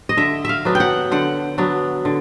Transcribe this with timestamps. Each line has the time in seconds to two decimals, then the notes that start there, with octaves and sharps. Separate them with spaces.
0.09 D#5
0.17 D3 E5
0.45 E5 F5
0.65 F#3 B3 D4
0.75 G5
0.80 F#5
1.12 D3 F#5
1.58 F#3 B3 D4
2.05 D3